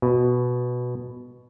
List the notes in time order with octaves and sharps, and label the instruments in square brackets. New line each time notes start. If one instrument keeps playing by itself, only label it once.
[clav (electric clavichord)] B2